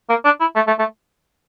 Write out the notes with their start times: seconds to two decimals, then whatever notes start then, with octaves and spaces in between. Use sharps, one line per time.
0.09 A#3
0.25 D4
0.40 E4
0.56 A3
0.67 A3
0.79 A3